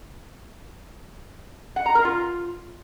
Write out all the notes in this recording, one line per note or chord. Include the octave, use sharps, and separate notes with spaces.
F#5
A#5
A#4
F4